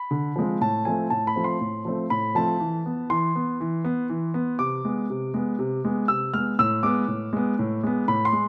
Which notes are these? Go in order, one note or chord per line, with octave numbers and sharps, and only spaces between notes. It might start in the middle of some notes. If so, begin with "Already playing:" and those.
Already playing: B5
D3
F3 G#3 C4
A2 A5
F3 A3 C4 G#5
A2 A5
B5
F3 A3 C4
C6
A2
F3 A3 C4
A2 B5
F3 A3 C4 A5
E3
B3
E3 C6
B3
E3
B3
E3
B3
C3 D6
G#3 B3
C3
G#3 B3
C3
G#3 B3
C3 E6
G#3 B3 F6
A2 E6
G#3 B3 D6
A2
G#3 B3
A2
G#3 B3
A2 B5
C6
G#3